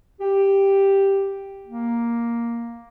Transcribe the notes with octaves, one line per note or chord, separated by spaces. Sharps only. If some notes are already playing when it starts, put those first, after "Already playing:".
G4
A#3